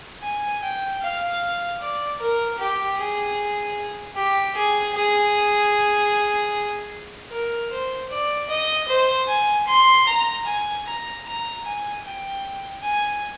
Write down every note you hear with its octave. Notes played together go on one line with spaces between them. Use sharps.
G#5
G5
F5
D5
A#4
G4
G#4
G4
G#4
G#4
A#4
C5
D5
D#5
C5
G#5
C6
A#5
G#5
A#5
A#5
G#5
G5
G#5